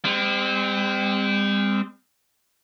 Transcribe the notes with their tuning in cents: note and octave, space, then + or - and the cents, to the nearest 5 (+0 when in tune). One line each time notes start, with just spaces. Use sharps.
G3 +45 C4 -20